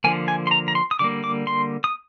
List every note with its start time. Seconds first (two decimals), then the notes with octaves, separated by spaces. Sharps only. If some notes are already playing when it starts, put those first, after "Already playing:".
0.04 D3 F3 A#3 G#5
0.28 G#5
0.47 C6
0.51 A#5
0.68 A#5
0.75 C6
0.91 D#6
0.99 D3 G3 A#3 D6
1.24 D6
1.47 C6
1.84 D#6